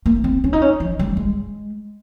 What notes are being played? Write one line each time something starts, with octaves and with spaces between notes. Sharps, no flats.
A#3
C4
C#4
D#4
C#4
F3
G3
G#3